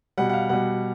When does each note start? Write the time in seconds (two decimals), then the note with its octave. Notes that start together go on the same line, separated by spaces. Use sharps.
0.18 B2 G3 F#5
0.29 F#5
0.33 F5
0.49 B2 G3 F#5